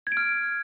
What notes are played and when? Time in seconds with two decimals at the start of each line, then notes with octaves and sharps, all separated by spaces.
0.07 G#6
0.12 D7
0.17 F6